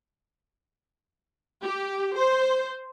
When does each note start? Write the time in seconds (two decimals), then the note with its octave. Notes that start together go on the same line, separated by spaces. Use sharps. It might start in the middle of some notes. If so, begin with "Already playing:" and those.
1.63 G4
2.16 C5